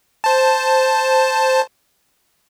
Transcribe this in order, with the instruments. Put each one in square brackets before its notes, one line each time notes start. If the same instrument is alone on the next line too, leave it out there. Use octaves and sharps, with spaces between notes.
[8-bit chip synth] C5 A5